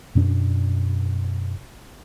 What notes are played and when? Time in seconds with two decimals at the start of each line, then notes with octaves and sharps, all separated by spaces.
0.15 F#2 B2 C#4 D4